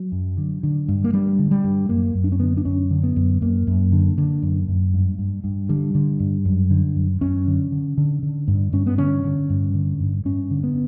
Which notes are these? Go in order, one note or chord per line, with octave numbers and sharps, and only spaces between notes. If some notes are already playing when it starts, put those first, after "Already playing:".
Already playing: F#3
F#2
D3
D3
G2
A#3
G2 G3
D3
G3
G2
F#2 A#3
F#2
D4
C#4
D3 B3
D4
F#2 C#4
D3
B3
F#2
F#2 A#3
F#2
D3
D3
F#2
F#2
G2
G2
G2
D3 G3
D3
G2
F#2
D3
F#2
F#2 C#4
D3
D3
D3
D3
G2
G2 C#4
B3
D3 C#4
D3
G2
D3
G2
G2 C#4
D3
B3